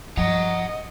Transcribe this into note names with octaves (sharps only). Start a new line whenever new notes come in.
G2 F3 D#5 F#5 A#5